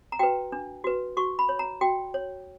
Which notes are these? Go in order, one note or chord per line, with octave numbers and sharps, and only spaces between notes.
A#5
F#4 B4 G5
D4
F#4 B4
F#4 C#6
B5
C#5
A#5
F#4 G5
C#5